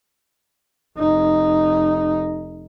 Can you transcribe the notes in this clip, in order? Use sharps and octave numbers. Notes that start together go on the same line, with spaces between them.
F1 D#4